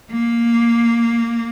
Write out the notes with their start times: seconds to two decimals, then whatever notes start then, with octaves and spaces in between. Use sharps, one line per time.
0.11 A#3